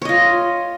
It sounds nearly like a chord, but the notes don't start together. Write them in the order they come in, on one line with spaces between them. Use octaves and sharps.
C#5 D#5 F4